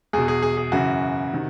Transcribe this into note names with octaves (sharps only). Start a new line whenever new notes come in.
E2 B2 G#4
G#4
G#4
G#4
F#2 C#3 E3 F#4
C3 D#3